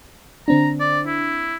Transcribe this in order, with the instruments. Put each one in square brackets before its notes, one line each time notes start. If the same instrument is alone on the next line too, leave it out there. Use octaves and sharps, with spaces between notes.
[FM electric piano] D3 C4 D4 [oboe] A#5
[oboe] D5
E4